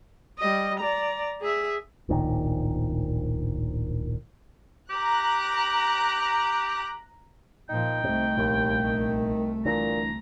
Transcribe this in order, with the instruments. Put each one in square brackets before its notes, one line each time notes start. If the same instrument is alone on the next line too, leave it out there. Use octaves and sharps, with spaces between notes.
[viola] G3 D#5
D5 A#5
G#4 E5
[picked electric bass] D1 A#1 A#2 D#3
[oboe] G4 [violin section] A#5 F#6
[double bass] A#2 F3 [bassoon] D#4 [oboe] G5
[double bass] C2 A3 [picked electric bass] C3
[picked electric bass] A#1 [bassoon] D#2
[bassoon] D#3
[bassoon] A#2 [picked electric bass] D3 E3 [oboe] A#5